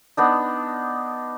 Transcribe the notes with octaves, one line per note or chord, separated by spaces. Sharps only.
B3 D4 D#4